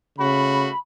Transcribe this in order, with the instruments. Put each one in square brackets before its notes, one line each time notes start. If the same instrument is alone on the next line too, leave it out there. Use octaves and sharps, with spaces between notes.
[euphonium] C#3 [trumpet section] A3 F#4 [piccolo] B5